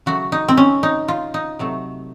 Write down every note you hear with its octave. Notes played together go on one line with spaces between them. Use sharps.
C#3 F#3 A3 F#4
D#4
C4
C#4
D#4
F4
D#4
C3 F#3 A3